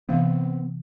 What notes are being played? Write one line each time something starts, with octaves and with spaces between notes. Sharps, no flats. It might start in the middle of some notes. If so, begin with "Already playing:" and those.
C3 E3 B3 C4 F5